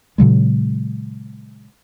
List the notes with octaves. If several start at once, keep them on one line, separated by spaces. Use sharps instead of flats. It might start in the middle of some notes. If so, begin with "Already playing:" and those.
A#2 C#3 F#3 G#3